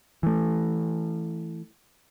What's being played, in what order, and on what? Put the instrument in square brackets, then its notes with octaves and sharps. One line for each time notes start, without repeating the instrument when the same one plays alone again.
[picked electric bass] E3 A3